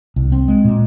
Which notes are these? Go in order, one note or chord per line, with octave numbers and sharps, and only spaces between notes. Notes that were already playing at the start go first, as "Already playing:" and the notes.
C2
C4
G#3
A#2